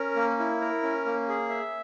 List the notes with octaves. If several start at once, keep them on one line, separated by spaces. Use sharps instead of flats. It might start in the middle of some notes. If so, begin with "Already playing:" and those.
Already playing: C#4 A#4
A#3
E4
A#4
C#4
A#3
G#4
E5